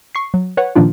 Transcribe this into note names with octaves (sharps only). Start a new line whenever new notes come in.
C#6 C7
F#3
B4 C#5 F#5
A#2 D#3 F3 A#3 D4 F4